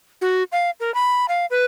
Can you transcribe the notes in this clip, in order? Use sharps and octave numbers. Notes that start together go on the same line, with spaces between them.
F#4
F5
A#4
B5
F5
B4